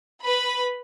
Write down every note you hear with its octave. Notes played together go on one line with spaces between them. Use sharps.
B4 B5